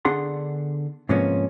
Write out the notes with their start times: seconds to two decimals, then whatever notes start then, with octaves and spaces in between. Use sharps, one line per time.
0.05 D3 B3 D4 G#4 F#5 C6
1.09 G#2 C3 F3 A#3 B3 C#4